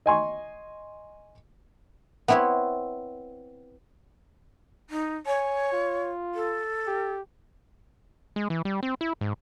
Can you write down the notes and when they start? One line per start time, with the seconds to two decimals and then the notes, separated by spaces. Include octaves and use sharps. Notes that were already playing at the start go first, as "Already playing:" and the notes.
0.06 D#5 G#5 C6 C#6
2.28 B3 C4 E4 B4 C#5
4.90 D#4
5.26 C#5 G#5
5.72 F4
6.35 A4
6.87 G4
8.36 G#3
8.50 E3
8.65 G3
8.83 C4
9.01 E4
9.21 G#2